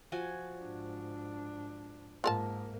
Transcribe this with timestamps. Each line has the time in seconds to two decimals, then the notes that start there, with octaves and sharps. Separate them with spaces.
0.12 F3 F#4 G#5
0.60 G#2 D4
2.24 G#2 A#3 F4 A#4 A5